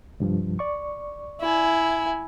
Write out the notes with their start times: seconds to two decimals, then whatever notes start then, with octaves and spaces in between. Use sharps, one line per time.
0.20 C2 G2 F3
0.59 D5 C#6
1.41 E4 G#5